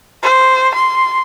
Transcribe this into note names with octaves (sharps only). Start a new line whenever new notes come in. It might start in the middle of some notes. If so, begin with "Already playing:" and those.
C5
C6